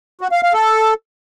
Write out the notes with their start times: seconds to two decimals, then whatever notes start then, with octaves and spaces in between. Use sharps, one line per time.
0.21 F#4
0.32 F5
0.43 F5
0.53 A4